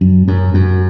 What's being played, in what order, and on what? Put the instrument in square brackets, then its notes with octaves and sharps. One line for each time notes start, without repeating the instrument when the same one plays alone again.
[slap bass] F#2
F#2
F#2